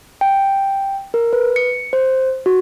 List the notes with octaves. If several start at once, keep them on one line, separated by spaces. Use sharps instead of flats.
G5
A#4
B4
C#7
C5
F#4